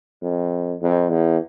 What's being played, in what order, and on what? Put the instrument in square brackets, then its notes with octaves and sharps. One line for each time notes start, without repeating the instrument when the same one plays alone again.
[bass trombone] F2
F2
E2